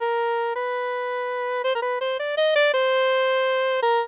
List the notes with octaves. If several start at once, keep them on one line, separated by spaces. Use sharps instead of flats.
A#4
B4
C5
A#4
B4
C5
D5
D#5
D5
C5
A#4